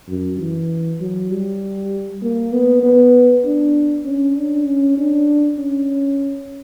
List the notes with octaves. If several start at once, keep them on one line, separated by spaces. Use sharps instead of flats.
F#2
E3
F#3
G3
A#3
B3
B3
D4
C#4
D4
C#4
D4
C#4